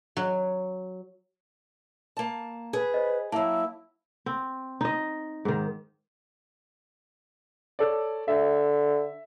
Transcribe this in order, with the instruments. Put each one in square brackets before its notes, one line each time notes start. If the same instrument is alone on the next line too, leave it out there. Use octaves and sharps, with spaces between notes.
[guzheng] F#3
[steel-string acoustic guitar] A#3 A5
[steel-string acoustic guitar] G#4 [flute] B4
[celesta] C5 D#5
[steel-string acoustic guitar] F#3 A#3 [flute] E4 [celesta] A5
[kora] C4
D#4 D#5
G#2 D#3
[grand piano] A4 C#5 D5
[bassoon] D3 [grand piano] E5